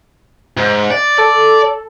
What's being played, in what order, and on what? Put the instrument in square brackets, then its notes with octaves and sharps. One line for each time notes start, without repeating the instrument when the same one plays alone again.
[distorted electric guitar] G#2
D5
[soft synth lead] A4 [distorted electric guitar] D5